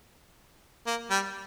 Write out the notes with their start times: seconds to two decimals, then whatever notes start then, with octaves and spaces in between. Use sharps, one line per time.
0.87 A#3
1.10 G3